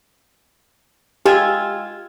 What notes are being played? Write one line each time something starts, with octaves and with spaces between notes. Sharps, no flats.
G#3 F4 G4 E6 G#6